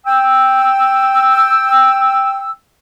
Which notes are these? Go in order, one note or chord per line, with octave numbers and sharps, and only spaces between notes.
G5 E6